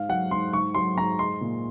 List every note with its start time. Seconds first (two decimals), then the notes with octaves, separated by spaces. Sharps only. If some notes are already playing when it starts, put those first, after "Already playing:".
Already playing: G#2 F5
0.09 F#3 F#5
0.31 G#2 C6
0.53 G#2 C#6
0.74 F#3 C6
0.97 G#2 A#5
1.19 G#3 C6
1.41 A#2